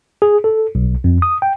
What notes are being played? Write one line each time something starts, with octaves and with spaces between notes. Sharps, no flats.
G#4
A4
B1
F2
D#6
G5